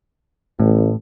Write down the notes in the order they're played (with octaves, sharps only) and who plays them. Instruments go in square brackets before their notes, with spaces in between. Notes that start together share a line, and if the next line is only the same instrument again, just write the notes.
[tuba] A1 [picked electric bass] A2